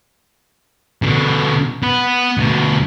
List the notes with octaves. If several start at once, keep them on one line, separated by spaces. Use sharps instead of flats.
B2 D3
B3 B4
D2 B2